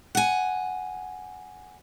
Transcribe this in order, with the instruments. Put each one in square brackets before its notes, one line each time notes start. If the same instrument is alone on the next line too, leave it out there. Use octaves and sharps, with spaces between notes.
[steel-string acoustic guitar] F#5 G#5